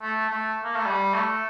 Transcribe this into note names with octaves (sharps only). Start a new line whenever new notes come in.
A3
A3
A#3
A3
G3
A3